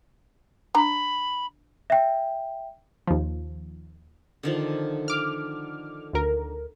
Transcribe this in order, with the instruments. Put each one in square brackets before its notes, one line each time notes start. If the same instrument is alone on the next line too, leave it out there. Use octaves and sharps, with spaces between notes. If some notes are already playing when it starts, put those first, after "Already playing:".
[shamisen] D4 A#5 [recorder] B5
[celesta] E5 G5
[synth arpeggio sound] D#2 F3
[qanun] D3 D#3 F3
[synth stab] D6 F6
D2 A#4